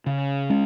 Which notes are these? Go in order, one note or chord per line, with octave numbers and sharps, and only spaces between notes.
C#3
G#3 C#4